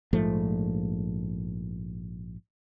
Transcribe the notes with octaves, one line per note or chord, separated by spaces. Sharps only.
A#1 G#2 F3 A3